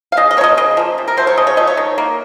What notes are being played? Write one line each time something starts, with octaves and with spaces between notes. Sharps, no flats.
F5
C#3 D#5
D#5
F3 A#3 C#5 D#5
C#3 D#5
F3 A#3
C3
A#4
F#3 A3 C5
C#5
C#3 D#5
C#5
F3 A3 D#5
C#5
D#3
A#3